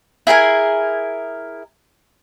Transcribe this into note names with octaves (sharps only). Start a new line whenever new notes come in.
E4 G#4 A#4 G#5